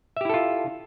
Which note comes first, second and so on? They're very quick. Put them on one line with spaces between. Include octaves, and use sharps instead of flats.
E5 G4 E4 A4 F4